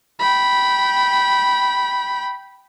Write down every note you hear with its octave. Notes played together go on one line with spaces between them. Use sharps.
G5 B5